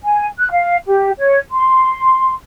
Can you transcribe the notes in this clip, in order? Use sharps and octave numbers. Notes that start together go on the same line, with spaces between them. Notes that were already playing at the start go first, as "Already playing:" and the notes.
G#5
F#6
F5
G4
C#5
C6